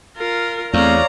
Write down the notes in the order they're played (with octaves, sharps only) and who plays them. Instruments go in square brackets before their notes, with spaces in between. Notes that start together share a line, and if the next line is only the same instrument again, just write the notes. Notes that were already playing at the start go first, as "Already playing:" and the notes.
[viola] F4 A#4
[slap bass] E2 [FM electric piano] A3 C4 [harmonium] C#5 D5 F5 [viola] A#5